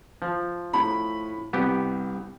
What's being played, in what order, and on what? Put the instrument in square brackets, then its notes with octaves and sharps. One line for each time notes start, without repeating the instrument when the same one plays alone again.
[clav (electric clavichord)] F3
[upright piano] A2 B5
[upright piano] C2 [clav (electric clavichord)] B3 G4